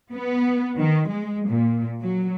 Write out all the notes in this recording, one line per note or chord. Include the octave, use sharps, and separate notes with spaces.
B3
D#3
G#3
A#2
F#3